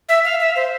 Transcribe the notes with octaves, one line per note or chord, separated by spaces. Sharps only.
E5
F5
E5
C5